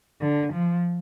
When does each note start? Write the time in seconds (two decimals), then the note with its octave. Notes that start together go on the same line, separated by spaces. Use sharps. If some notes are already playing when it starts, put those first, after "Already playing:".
0.21 D3
0.53 F3